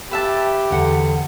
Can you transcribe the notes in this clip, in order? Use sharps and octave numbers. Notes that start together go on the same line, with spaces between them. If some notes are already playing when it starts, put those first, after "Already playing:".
G4 B4 E5 A5
E2 D3 F#5